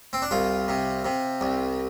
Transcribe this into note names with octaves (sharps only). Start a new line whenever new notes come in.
C4
D4
C2 F4
C3
C3
C2